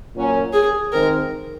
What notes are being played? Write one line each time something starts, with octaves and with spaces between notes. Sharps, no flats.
A#2 F#3 C#4
G#4
D#3 G#3 C4 A#4